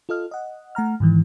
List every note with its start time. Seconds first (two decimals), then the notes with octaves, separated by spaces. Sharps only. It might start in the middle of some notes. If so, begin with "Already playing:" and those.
0.09 F4 A4 D#5 F6
0.31 D#5 F#5
0.75 A3 F#5 A#5 F6
1.00 G#2 D#3 E3